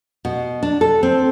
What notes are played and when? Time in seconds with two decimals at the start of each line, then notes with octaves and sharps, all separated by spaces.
0.25 B2
0.63 D4
0.81 A4
1.03 C4